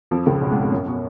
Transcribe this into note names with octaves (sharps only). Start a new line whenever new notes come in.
F2 F3
C#2 C#3
B1 B2
G#2
G#2
F#2
B2